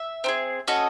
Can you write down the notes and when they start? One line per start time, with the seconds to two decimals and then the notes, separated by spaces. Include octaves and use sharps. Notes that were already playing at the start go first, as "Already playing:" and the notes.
Already playing: E5
0.24 C4 D#4
0.28 G#4
0.68 C#4 F#4 A4 D#5